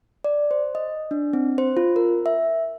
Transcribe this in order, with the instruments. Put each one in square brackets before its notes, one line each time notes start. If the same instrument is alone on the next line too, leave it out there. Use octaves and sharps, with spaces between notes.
[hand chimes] D5
C5
D#5
D4
C4
C5
F4
A#4
E5